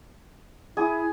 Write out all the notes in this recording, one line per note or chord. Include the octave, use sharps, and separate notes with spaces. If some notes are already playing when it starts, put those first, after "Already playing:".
E4 G#4 D#6